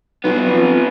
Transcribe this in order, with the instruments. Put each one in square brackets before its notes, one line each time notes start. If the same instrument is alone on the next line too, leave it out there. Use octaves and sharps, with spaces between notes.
[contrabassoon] B1 [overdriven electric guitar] G2 B3
[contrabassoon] F2